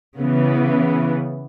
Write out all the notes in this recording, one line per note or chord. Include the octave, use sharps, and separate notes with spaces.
C#3 E3 B3